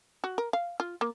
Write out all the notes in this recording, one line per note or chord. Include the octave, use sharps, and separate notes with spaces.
F#4
A#4
F5
F4
A#3